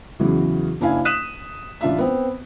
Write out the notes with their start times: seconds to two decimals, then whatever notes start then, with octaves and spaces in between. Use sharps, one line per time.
0.20 E2 C#3 E3 F#3
0.80 F#1 D4 E4 F5 G#5
1.05 D#6 F#6 B6 D#7 E7
1.81 A1 D4 F4 E5
1.98 B3 C4